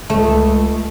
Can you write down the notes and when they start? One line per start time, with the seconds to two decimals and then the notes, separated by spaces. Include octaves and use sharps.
0.10 C#2 A3